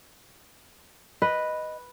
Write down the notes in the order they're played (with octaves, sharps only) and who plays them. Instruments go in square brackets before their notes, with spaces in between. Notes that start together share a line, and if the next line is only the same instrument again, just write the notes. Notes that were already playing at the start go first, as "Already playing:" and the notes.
[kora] B4 [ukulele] D#5